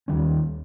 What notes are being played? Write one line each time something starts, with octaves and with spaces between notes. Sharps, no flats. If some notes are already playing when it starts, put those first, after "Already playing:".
D#2 D#3 G3 C#4